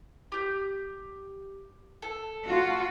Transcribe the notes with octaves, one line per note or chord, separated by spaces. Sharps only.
G4 G6
A4
F4 F#4